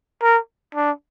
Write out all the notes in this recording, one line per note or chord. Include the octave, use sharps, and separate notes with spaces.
A#4
D4